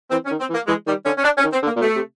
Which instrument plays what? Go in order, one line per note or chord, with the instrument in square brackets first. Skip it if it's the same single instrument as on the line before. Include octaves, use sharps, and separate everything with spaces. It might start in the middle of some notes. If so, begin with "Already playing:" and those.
[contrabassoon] E3 [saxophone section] C4
[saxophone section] C#4
[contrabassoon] D#3
[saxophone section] C4
[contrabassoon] E3
[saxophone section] A#3
[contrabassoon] E3 [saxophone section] G#3
[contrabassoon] D#3 [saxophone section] G3
[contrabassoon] D3 [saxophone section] C#4
[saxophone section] C#4
D4
C#4
[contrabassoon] D#3
[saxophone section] C4
[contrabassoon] D3
[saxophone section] A#3
[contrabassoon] A#2
[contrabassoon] B2 [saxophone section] A3
[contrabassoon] C3